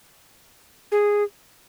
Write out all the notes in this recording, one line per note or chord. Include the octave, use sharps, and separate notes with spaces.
G#4